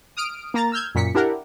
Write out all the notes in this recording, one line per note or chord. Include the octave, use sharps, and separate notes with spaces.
D#6 F6 D7
A#3 A#5 A6
E6 F6 G6 G#6
F#2 A#2 B6 C#7
D4 E4 G4 A#4 F#5